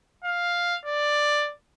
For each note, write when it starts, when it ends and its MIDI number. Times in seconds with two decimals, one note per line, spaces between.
0.25 0.78 77
0.86 1.51 74